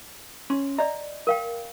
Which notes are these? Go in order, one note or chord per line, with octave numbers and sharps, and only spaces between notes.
C#4 C6
D5 D#5 A#5
A#4 F5 G5